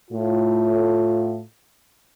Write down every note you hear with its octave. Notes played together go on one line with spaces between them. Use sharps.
A2 F4